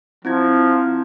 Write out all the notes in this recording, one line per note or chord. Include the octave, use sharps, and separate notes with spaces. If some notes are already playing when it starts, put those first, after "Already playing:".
F3 C4 E4 G#6